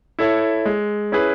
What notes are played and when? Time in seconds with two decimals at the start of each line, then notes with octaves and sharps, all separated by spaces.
0.19 E4 A4 C#5 E5
0.66 G#3
1.12 C#4 E4 G#4 B4